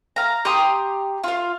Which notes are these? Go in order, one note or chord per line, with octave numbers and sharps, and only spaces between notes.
F5 A#5
G4 A#5 C6 D#6
F4 F5